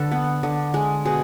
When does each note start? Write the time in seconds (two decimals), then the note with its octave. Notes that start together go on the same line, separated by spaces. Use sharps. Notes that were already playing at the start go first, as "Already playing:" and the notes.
Already playing: D3 A4 B4
0.12 B3
0.43 D3
0.74 G#3
1.05 B2 G#4